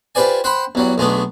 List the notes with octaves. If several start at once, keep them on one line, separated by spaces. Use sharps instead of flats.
F4 G4 B4 C5 D5 G#5
C5 F#5 G5 B5 C6
E2 F#3 G3
B1 G#3 A3 B3 D4